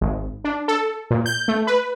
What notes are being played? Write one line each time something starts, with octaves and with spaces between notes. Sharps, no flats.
G#1
D4
A4
A#2
G6
A3
B4